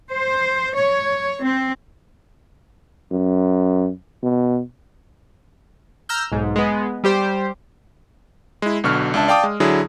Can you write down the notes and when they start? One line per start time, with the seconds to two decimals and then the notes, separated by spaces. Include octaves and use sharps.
0.11 C5
0.74 C#5
1.41 C4
3.11 F#2
4.23 B2
6.09 A#5 E6 F6 G6
6.32 B1 G#2
6.56 G#3 B3
7.04 G3 G4 C5
8.62 G#3 E4
8.84 B1 B2 D3 C#6 F6
9.14 C#2 D4 E5 A5
9.28 D5 F5 G5 A5 D6 D#6
9.43 G#3
9.60 D3 F#3 E4 G#4